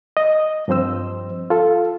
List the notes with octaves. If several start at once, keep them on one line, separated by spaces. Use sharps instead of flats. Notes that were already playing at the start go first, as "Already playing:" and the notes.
D#5
G2 F3 C4 C5 E6
F4 A4